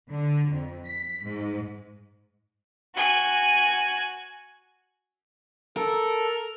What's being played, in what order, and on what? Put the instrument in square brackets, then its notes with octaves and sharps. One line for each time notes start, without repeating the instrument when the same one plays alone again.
[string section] D3
F2
B6
G#2
[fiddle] F#4 G#5
[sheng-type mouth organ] A4 [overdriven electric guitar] A#4